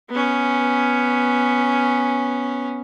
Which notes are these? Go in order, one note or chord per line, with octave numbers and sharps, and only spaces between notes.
B3 C#4